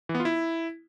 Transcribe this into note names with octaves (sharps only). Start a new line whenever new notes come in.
E3
B3
F4
E4